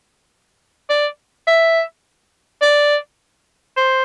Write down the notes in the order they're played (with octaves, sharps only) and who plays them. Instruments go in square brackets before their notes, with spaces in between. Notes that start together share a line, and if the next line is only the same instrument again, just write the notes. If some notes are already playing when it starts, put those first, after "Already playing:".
[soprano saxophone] D5
E5
D5
C5